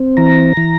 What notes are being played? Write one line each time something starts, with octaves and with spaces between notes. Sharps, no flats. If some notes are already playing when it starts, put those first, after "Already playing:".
Already playing: C4
E3 A#5
E3